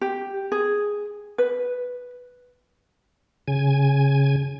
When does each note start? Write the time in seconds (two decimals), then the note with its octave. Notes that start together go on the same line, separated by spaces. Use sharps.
0.01 G4
0.52 G#4
1.38 B4
3.48 C#3 G#5